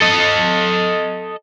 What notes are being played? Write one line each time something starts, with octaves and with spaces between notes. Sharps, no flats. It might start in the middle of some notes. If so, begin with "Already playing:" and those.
A4 D#5